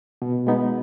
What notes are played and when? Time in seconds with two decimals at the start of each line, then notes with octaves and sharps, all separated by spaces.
0.22 B2
0.47 G#3 B3 D#4